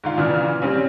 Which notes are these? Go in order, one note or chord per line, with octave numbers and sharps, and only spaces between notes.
G#2 D3 F4
A#2 C#3 E3 D5 F6
G3 C4 C#4